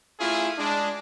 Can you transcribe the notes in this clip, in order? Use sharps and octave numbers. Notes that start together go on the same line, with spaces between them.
A3 C#4 E4 F4 G#4
G#3 D4